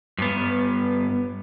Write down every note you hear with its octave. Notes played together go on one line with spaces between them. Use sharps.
G2 B3